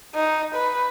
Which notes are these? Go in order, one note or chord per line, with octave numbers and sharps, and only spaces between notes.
D#4
B4